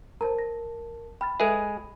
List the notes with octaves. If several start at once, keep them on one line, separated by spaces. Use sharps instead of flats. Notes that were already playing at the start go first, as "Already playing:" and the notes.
A#4 C5 A5 A#5
A#6
G5 B5 F6 A6
G#3 G#4 A4 B4 E5